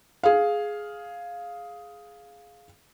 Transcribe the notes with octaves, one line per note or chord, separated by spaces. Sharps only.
G#4 F5